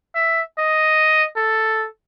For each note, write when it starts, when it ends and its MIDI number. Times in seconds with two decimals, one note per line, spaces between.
0.15 0.41 76
0.58 1.25 75
1.36 1.86 69